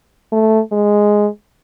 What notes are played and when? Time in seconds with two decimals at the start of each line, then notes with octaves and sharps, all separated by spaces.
0.32 A3
0.72 G#3